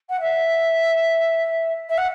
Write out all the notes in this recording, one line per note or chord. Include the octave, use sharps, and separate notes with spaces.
F#5
E5
E5
F#5